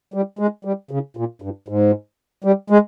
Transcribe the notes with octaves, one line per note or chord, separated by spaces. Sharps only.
G3
G#3
G3
C#3
A#2
G2
G#2
G3
G#3